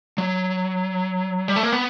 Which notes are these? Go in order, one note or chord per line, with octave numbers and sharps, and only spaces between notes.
F#3
G3
A3
A#3
B3